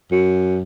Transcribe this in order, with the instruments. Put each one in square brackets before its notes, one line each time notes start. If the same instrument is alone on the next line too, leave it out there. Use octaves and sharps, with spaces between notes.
[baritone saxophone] F#2